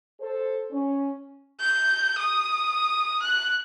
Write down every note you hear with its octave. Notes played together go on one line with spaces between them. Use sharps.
A4 C5
C#4
G6
D#6
F#6